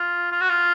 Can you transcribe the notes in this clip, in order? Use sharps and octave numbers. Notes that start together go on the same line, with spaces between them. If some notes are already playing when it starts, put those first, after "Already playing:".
Already playing: F4
F4
F#4
F4